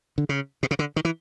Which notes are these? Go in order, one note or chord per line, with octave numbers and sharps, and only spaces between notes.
D3
C#3
B2
C#3
D3
D#3
E3